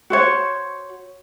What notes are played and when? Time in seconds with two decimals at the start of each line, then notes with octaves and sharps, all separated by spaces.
0.10 F#4 C5 C#5